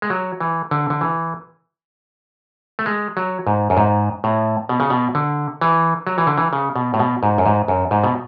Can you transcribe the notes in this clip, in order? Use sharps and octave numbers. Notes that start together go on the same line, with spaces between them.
G#3
F#3
E3
D3
D3
E3
A3
G#3
F#3
G#2
F#2
G#2
A2
B2
C#3
B2
D3
E3
F#3
E3
D3
E3
C#3
B2
A2
B2
G#2
F#2
G#2
F#2
G#2
B2